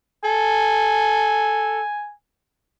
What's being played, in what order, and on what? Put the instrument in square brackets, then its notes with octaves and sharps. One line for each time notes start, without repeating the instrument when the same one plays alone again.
[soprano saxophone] A4 [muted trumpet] G#5